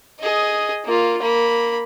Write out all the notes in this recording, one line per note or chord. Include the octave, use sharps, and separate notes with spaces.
G#4 D#5
A#3 F4
A#3 B5